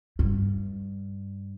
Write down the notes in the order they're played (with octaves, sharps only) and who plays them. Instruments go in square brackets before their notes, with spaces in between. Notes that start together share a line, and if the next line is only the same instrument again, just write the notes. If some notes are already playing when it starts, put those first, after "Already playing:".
[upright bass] G2